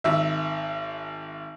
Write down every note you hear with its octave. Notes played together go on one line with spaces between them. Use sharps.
G#1 E5